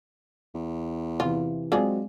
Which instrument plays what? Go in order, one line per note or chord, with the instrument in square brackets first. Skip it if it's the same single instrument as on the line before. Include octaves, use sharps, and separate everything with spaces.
[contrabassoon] E2
[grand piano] C3 E3 [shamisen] F4
[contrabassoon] F#3 [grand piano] G#3 C4 [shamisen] D4 F4 G#4